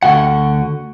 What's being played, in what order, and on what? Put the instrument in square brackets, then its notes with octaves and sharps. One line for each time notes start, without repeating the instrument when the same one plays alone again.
[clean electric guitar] D2 D3 F#4 F#5